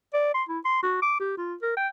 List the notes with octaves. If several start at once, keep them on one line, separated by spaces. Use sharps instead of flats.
D5
C6
E4
C6
F#4
D6
G4
F4
A#4
G5